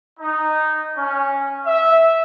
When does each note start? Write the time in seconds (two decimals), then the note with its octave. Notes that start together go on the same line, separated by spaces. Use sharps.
0.20 D#4
0.97 C#4
1.66 E5